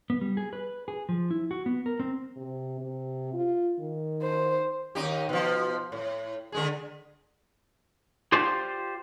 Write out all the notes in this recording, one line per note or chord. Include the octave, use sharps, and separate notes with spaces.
B3
G3
G#4
B4
G#4
F3
E4
F#4
B3
A#4
C4
C3
C3
F4
D#3
C5
D#2 D#4 G4
B2 F3
A2
D3 G#3 G#4
F4 G4 C5 D5 F5